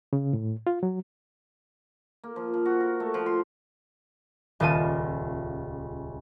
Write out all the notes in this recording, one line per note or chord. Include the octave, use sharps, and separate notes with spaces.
C#3
A2
F4
F#3
A#3
F3
F3
F#4
A#4
A3
F3
C6
D#1 C#2 F4 A4 A6 D#7